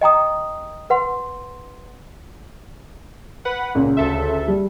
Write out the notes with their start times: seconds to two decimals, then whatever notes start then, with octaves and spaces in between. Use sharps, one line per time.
0.01 D#5 G5 A#5 D#6
0.90 B4 F#5 C6
3.45 B4 F#5
3.75 C#2 A#2
3.97 D2 A4 E5
4.48 G3